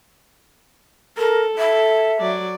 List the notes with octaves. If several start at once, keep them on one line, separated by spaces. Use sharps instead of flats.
A4 A#4
A4 E5
F#3 D5